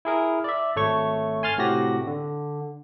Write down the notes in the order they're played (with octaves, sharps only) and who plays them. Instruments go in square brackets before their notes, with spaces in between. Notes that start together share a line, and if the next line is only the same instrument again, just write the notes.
[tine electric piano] E4 G#4 A#4
D5 E5
G#1 A3 C#5 C#6
G#5 C6 F6 A6
A2 C3 F#4 G4 A#6
D3